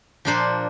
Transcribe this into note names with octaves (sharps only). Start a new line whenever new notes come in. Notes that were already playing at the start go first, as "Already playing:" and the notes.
A#2 F3 A#3 D4 C5